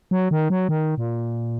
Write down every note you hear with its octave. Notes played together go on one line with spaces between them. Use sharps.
F#3
D#3
F#3
D#3
A#2